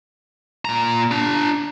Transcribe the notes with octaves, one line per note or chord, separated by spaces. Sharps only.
A#2 A#5
D4 A#5